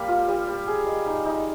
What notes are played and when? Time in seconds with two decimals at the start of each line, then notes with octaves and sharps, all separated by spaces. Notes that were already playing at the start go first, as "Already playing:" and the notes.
Already playing: G3 A#3
0.08 F4
0.28 G3
0.48 G3
0.67 G#4
0.87 D#5
1.06 D#4
1.25 D#4